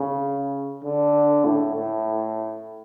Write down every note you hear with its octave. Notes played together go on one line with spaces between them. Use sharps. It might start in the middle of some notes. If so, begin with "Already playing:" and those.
Already playing: C#3
D3
A2
A2